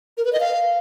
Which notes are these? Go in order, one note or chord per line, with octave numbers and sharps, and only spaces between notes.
A#4
B4
D#5
F5